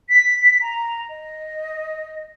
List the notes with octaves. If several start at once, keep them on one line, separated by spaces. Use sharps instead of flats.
B6
A#5
D#5